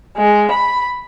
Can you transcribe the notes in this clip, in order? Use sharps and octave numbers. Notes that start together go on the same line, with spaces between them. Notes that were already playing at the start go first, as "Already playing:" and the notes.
G#3
B5